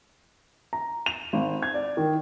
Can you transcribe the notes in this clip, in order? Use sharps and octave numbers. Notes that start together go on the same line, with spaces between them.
A#5
F7
G#1
G#6
D5
D#3